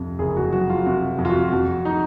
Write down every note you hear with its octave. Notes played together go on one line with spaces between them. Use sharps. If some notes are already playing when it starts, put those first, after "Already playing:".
Already playing: F2 C3
F#1 G#4
F#4
F#3 F#4
F4
C3 F#4
F2
F4
F#4
F2 F#4
D#4